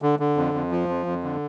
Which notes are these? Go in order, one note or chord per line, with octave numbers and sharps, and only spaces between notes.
D3
D3
F2
F2
F3
F2
F2
D3